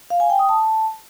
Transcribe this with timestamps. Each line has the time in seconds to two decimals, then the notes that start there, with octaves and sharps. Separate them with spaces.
0.10 F5
0.20 G#5
0.30 G5
0.39 D#6
0.49 A5